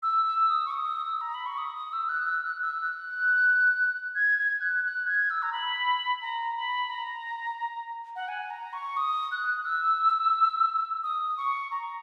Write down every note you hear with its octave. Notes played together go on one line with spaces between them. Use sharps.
E6
E6
D#6
C#6
D#6
E6
A#5
B5
C#6
D#6
D#6
E6
F#6
E6
F#6
E6
F#6
G#6
G#6
F#6
F#6
G#6
E6
A#5
B5
A#5
B5
A#5
F#5
G#5
A#5
C#6
D#6
F#6
E6
D#6
C#6
A#5